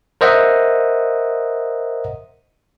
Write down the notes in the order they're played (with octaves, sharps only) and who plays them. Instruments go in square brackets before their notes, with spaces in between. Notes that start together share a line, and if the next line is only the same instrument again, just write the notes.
[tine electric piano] A#4 C5 D#5 E5 F#5